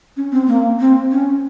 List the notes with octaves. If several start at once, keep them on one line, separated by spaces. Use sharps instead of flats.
C#4
C4
A#3
C4
C#4